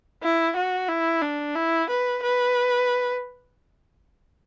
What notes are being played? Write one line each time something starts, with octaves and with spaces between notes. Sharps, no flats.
E4
F#4
E4
D4
E4
B4
B4